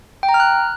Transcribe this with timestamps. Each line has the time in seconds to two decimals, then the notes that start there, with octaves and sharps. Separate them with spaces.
0.23 G5
0.29 A#5
0.34 F6
0.40 F#6